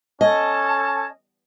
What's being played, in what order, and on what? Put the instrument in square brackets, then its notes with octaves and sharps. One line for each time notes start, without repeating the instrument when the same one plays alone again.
[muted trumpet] C#4 [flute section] A4 A5 G#6 [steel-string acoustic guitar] D#5